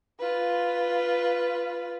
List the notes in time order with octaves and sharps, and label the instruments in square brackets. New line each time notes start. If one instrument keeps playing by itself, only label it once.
[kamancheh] F4 B4